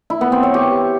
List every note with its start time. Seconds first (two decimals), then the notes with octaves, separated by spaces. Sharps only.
0.10 E4
0.21 B3
0.32 C4
0.43 C#5
0.54 G4